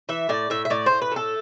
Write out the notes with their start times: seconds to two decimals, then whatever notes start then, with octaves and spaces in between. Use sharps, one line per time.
0.09 E3 E5
0.29 A2 D5
0.50 A2 E5
0.65 E5
0.70 A2 D5
0.86 A2 C5
1.01 B4
1.12 A3 A4